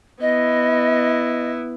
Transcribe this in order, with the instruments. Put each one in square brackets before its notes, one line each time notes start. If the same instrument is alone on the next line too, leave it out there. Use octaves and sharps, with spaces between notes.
[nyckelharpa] B3 E4 [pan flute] D#5